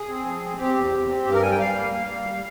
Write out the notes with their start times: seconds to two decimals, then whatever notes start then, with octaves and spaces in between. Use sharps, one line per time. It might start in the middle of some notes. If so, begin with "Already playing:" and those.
Already playing: G#4
0.09 C4
0.25 F3
0.43 C4
0.58 C4 G4
0.75 E2
0.92 E2
1.09 C4
1.26 G2 G4
1.34 A#4
1.42 G3 G#5
1.51 G5
1.59 G3 F5
1.75 A#3
1.92 A#3
2.10 G3
2.26 G3